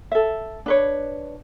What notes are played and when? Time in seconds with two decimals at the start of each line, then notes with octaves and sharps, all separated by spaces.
0.12 A4 E5
0.66 D4 B4 C#5